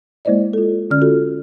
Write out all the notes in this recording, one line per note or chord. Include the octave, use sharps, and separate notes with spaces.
G#3 A#3 E4 C5 D5 D#5
F4 A4
D3 C#4 D5 F6
F4 F#4 A4